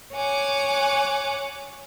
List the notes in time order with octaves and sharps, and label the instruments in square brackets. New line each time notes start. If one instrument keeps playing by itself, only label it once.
[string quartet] C#5 F#5 G#5 D6